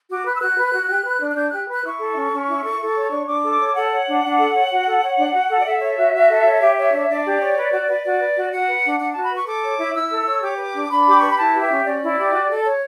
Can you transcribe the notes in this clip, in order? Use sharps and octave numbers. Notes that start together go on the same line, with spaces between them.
F#4 D6
B4 F#6
E6
F#4 F#6
B4
F#4
G4
B4
D4
F#6
D4 G6
G4 F#6
B4 F#6
E4 C#6
A4
C#4
C#4
E4
A4
A4
C#5
D4
D4 D6
A4
C#5
A4 F#5
C#5
D4
D4
A4
C#5
F#4
A4
C#5
D4
F#4
A4
D5
A4 E5
C#5
F#4
F#4
A4
C#5
G4
C#5
D4
D4 D5
G4
C#5
B4
F#4
B4
F#4 D5
B4
F#4
F#4 F#5
B4
D4
D4 F#5
F#4 A5
B5
B4 C#6
A4 D6
C#5
E4
E4 E6
A4
C#5
G4 D6
B4
D4
D4 B5
G4 D6
B4 C#6
B5
E4 A5
G4
E5
C#4
C#4 D5
E4
G4
F#4
A4
C#5